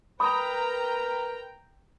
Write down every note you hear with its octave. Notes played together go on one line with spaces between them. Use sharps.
A#4 B4 G5 A#5 B5 D#6